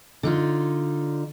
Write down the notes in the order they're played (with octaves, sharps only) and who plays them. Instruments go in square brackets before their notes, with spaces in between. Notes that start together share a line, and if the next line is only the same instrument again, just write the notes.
[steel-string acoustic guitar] D3 D#4 F4